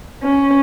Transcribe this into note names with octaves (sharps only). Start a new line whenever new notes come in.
C#4